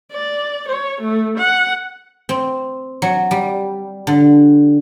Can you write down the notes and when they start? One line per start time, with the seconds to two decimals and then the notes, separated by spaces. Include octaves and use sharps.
0.12 D5
0.69 C#5
1.01 A3
1.38 F#5
2.29 C4
3.02 F#3
3.31 G3
4.07 D3